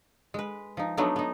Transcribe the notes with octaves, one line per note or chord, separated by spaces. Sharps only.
G#3 B4
F3 D#4
F#3 A3 B3 D4 D#4
B3 D#4